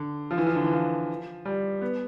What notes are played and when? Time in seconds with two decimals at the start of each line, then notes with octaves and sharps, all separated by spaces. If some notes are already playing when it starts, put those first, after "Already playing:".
Already playing: D3
0.31 F3
0.38 E3
0.47 F3
0.55 D3
0.64 E3
0.73 F3
1.45 G3
1.81 B3